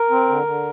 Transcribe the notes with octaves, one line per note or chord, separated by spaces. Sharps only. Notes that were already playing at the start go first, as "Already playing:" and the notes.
Already playing: A#4
C4
D3
D3